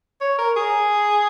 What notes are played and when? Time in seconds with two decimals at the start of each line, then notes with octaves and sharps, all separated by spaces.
0.21 C#5
0.39 A#4
0.56 G#4